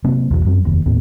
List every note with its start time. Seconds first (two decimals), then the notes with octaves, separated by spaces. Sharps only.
0.04 C3 F#3 A#3 C4
0.31 B1 E2
0.45 F#2 F#3 C4
0.65 F1 D#2
0.86 D#2 A2 B3